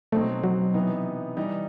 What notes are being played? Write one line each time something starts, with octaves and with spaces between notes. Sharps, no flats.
B2 F#3 A3 C4 D#4
F#3
C3 E3 B3 D#4
E3 G3 D#4